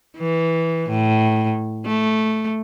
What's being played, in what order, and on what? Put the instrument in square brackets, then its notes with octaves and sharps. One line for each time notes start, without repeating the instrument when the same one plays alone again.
[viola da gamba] E3
A2
A3